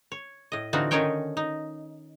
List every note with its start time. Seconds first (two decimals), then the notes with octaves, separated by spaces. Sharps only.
0.12 C#5
0.52 A2 D#5
0.73 D3 E3 C4 D#4 F4 F#4
0.91 D3 D#3 C#4 D#4 C#5 G5
1.37 D#4